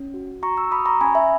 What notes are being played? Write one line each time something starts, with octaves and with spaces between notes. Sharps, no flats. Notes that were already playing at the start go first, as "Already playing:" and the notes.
Already playing: C#4
F#4
F#4 A#5 C#6
C#6 E6
F#4 B5 D#6
A#5 C#6
C#4 G#5 B5
E5 G#5